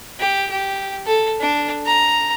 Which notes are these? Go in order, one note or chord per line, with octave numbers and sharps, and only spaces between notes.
G4
G4
A4
D4
A#5